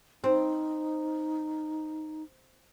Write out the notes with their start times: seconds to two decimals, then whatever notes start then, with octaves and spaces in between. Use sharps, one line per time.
0.24 C4 D#4